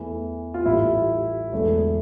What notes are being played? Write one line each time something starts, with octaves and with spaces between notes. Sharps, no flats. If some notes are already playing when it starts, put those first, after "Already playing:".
Already playing: E2 E3 A3
F4
A1 A2 G3 E4
E1 E2 D3 A3